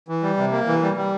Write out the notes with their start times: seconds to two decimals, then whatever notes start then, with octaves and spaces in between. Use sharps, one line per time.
0.08 E3
0.23 G3
0.37 C3
0.52 A#3
0.67 E3
0.82 G3
0.97 G3